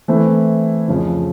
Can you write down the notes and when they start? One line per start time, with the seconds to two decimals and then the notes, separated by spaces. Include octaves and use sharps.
0.08 E3 A3 C4 E4
0.88 F2 C#3 F3